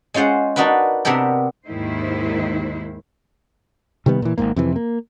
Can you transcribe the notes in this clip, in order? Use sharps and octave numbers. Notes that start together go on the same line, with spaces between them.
G#3 C#4 F4 C5 F#5
D4 D#4 F#4 A#4 B4
C3 B3 D4 G4 A#4
D#2 G#2 D#3 E4 C5
C3 D#3 G3 B3
A#2 E3
G#1 D#2 G#2 A#3
F2 C3 E3
A#3